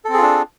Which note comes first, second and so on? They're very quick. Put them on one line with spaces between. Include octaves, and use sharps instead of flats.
A4 C4 G#4 F4 D4